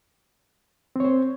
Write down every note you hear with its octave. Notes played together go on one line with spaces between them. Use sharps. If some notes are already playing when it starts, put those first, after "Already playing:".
C4 C5 C#5